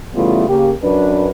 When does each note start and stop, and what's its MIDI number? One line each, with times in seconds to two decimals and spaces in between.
0.14 0.46 49
0.14 0.46 52
0.14 0.46 55
0.14 0.46 57
0.14 0.46 59
0.14 0.46 65
0.49 0.72 49
0.49 0.72 58
0.49 0.72 67
0.83 1.29 42
0.83 1.29 62
0.83 1.29 71